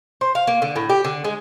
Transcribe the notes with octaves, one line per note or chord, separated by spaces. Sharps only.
C5
F5
A#3
D3
A2
G4
D3
G#3